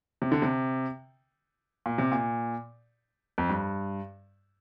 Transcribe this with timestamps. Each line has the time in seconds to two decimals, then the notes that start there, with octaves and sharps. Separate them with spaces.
0.22 C3
0.32 D3
0.42 C3
1.86 A#2
1.98 C3
2.12 A#2
3.38 F2
3.49 G2